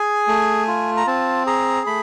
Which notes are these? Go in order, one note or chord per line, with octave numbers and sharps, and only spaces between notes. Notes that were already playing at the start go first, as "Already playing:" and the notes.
Already playing: G#4 G#5
A3
F4
A#5
C4 A5
G#4 A#5
A3 B5